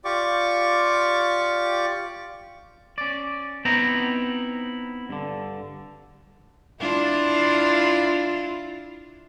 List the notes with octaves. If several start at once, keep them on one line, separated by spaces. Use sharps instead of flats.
F4 G4 D5 C#6 D6
C#4 D5
B3 C4 D#4 E4 G5 A#5
G2 D3
D4 E4 F4